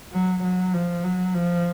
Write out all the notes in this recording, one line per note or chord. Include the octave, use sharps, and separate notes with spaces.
F#3
F#3
F3
F#3
F3